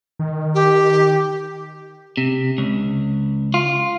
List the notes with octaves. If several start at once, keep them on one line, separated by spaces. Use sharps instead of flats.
D#3
G4
C3
C#2
F4